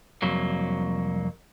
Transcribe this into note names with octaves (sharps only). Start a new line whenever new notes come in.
C2 F2 F#3 A#3